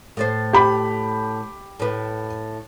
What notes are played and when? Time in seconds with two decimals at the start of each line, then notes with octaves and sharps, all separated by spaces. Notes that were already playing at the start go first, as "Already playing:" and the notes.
0.17 A2 A4 C5
0.53 G4 B5
1.80 A2 B4